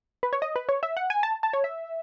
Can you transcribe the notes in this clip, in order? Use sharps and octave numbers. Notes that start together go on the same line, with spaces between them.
B4
C#5
D#5
B4
C#5
E5
F#5
G#5
A5
A5
C#5
E5